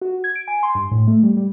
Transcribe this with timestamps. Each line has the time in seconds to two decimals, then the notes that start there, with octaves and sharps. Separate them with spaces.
0.01 F#4
0.24 G#6
0.35 D7
0.48 G#5
0.63 C6
0.75 G2
0.91 A2
1.08 A3
1.23 G3
1.37 G3